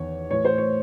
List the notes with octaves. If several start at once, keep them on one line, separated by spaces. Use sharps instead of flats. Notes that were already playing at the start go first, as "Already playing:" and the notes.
Already playing: E2 D#3 C#5
A2 E3 C#5
C5
C#5